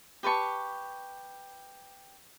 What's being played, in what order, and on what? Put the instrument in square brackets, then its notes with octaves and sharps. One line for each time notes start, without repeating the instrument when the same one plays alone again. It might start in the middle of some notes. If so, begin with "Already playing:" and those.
[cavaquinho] G4 B4 A5 C#6